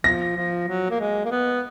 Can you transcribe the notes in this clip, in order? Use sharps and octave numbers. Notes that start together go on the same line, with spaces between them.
F3 A#6
F3
F#3
A#3
G#3
A#3
B3